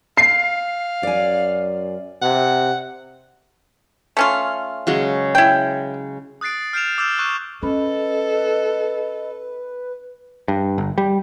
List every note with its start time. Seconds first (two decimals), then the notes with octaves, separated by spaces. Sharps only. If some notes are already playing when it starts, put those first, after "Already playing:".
0.17 F5 C7
1.03 F#2 D5 G#5
2.22 C3 F#5
4.17 A3 C#4 F4
4.87 C#3 F#3 G#3
5.35 E4 G5
6.41 D#6 F#6 A6 C7 D7
6.73 F6 G6 C7 D7 E7 F7
6.98 D6 E6 F6 G6 A6 E7
7.18 C#6 F#6
7.63 C#4 A4 B4 D#5
10.48 G2
10.78 G1
10.98 G3